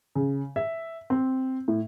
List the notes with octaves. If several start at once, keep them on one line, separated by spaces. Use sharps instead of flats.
C#3
E5
C4
A2